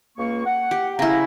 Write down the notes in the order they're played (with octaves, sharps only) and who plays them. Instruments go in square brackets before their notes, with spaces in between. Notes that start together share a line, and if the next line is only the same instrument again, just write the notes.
[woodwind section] C#2 A#3 C#6
F#5
[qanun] G4
[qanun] C#3 E4 [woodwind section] F5 A#5